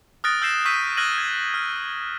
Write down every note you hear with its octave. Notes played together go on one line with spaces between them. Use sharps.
D#6 F6 F#6 A6 A#6 D7
E6 G6 A#6 C7 E7
C#6 E6 G6 B6 D#7
F6 F#6 G#6 A#6 D#7 F#7
G#6
F6